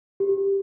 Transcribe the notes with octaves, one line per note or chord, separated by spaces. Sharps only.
G4